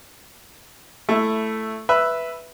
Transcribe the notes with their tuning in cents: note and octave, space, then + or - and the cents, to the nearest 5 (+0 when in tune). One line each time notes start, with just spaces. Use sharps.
A3 +0 E4 +10
B4 +0 E5 +0